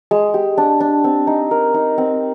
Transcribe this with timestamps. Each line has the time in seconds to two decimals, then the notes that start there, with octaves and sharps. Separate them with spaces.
0.11 G#3
0.34 G4
0.58 D4
0.80 D4
1.04 C4
1.27 D#4
1.51 A#4
1.74 D#4
1.98 C4